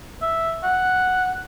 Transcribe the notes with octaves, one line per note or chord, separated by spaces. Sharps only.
E5
F#5